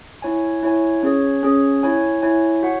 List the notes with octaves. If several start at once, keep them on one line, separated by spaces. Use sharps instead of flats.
E4 C#5 G#5
E4 C#5 G#5
C#4 G#4 C#5
C#4 G#4 C#5
E4 C#5 G#5
E4 C#5 G#5
F#4 C#5 F#5